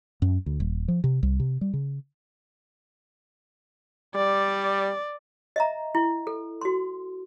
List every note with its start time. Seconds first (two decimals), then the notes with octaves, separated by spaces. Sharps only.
0.22 F#2
0.46 D2
0.60 D#1
0.88 F3
1.04 C3
1.23 C2
1.40 C3
1.61 G3
1.73 C#3
4.15 G3 D5
5.56 D#5 E5 A#5
5.95 E4
6.27 A4
6.61 F#4 C6